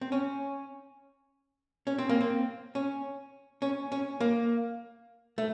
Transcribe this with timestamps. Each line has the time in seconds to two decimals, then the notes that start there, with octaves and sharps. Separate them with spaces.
0.01 C4
0.12 C#4
1.87 C#4
1.98 C4
2.09 A#3
2.21 C4
2.75 C#4
3.62 C#4
3.92 C#4
4.20 A#3
5.38 A3